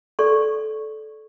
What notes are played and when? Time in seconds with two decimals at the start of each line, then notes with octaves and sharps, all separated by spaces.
0.19 A4 D5 C#6